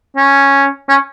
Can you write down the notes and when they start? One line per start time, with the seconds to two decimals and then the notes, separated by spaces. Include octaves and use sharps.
0.17 C#4
0.89 C#4